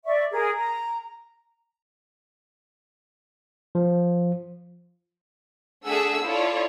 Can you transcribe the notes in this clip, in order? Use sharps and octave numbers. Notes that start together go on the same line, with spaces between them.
D5 E5 C#6
G#4 A#4
A#5
F3
A3 D4 G#4 E5 F#5 E6
E4 F4 A4 C#5 D5